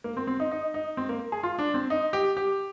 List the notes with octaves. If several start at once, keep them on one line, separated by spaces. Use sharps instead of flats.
A#3
C4
C4
D#4
D#4
D#4
C4
A#3
G#4
F4
D4
C4
D#4
G4
G4